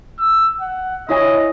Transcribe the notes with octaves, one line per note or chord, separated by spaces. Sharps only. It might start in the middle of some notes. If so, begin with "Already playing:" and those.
E6
F#5
E4 C#5 D#5 G#5